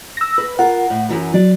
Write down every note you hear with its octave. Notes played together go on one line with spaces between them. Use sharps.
E6 A#6
B4
F4 A#4 F#5
A2
F#2 E3 F#3
F#3 D5